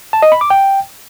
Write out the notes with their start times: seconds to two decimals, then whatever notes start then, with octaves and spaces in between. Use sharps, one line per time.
0.13 A5
0.22 D#5
0.32 B5
0.41 D6
0.50 G5